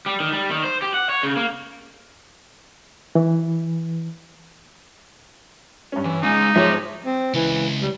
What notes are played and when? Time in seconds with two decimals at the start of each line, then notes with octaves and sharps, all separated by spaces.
0.06 G3
0.20 D#3
0.32 G3
0.51 D#3
0.64 C5
0.82 G4
0.94 F#5
1.09 C#5
1.23 C#3
1.37 A#3
3.15 E3
5.92 G2 C#4
6.05 E3
6.23 G#3 C#4 D#4 G#5
6.56 F3 G#3 C5 C#5 E5
7.05 C4
7.34 C#2 E3
7.82 G3